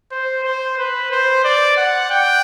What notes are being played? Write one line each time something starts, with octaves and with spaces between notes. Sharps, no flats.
C5
C5
B4
C5
D5
F#5
G5